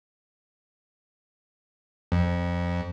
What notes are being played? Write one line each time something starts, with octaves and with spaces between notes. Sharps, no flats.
F2